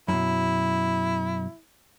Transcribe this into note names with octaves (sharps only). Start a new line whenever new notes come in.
F#2 B2 E4